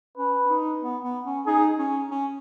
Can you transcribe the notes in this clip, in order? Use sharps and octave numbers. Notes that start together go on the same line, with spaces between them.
C#4 B4
C#4
D#4
B3
B3
C#4
D#4 G#4
C#4
C#4